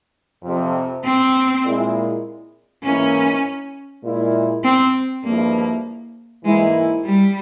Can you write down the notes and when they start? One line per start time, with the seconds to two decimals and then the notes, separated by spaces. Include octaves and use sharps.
0.44 F2 C3 F3
1.04 C4
1.64 A#2 G#3 E4
2.84 G#2 E3 A#3 C#4 E4
4.04 A#2 G#3 E4
4.64 C4
5.24 G2 F3 G#3 A#3 E4
6.45 G#2 E3 G#3 A#3 E4
7.05 G3